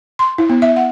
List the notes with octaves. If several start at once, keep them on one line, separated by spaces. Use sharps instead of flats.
C6
E4
B3
E5
F#5